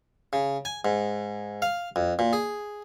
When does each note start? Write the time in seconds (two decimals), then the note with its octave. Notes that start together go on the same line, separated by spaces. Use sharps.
0.33 C#3
0.65 G#5
0.85 G#2
1.62 F5
1.96 F2
2.19 A#2
2.33 G#4